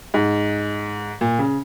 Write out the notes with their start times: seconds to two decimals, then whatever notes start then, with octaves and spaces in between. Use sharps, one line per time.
0.14 G#2
1.21 A#2
1.39 C#3